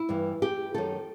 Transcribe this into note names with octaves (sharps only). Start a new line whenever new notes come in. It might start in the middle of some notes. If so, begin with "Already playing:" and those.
Already playing: E4
G2 E3
G4
F#2 D#3 A4